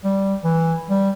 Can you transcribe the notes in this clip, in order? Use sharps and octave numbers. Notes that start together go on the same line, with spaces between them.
G3
E3
G3